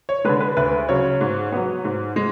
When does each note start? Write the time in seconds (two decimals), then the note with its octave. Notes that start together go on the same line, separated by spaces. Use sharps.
0.09 C#5
0.25 D3 G#3 B4
0.40 B4
0.57 D2 B4
0.89 C#3 F#3 C#5
1.21 G#2
1.52 F#3 B3
1.85 G#2
2.16 G#3